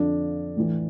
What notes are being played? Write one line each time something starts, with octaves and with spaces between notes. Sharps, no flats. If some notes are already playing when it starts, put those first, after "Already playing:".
Already playing: F2 D3 F3 D4
A2 E3